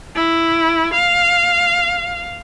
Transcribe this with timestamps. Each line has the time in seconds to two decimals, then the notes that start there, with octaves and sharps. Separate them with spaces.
0.16 E4
0.94 F5